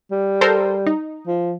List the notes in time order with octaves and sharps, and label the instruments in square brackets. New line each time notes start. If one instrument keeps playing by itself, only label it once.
[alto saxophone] G3
[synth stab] A4 A#4 C5
D#4
[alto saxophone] F3